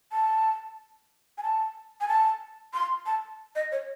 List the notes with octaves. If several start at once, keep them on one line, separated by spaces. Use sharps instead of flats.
A5
G#5
A5
G#5
A5
C6
A5
D#5
C#5